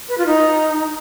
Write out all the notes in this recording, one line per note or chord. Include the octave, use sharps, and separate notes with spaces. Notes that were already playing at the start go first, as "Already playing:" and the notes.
B4
F4
D#4